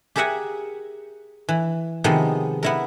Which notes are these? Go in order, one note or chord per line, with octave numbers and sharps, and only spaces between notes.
G4 G#4 A#4 E5 F#5 G#5
E3
C3 D#3 F3 G#3 B3 D#4
B3 E4 A#4